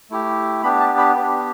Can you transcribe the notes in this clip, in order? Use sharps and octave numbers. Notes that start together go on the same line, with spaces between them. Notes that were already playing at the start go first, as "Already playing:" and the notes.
A3 E4 G4
B3 D4 G4 B5
A5
B5
B3 D4 G4